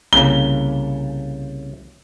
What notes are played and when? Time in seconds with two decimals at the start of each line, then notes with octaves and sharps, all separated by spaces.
0.13 C2 C#3 A#3 G7